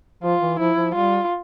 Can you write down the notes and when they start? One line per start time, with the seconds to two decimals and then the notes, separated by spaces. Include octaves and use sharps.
0.23 F3 F4
0.42 E3
0.59 F3 E4
0.77 F3
0.94 G3 F4